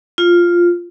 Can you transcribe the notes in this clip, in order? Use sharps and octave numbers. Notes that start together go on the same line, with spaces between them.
F4